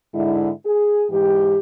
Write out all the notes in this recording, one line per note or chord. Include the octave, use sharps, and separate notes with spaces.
G#2 D3 G#3 E4
G#4
G#2 E3 G4